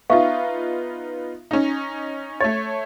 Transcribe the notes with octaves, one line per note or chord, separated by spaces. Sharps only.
B3 D#4 F4 E5 F5 C#6
C#4 D#4
A3 C#5 A6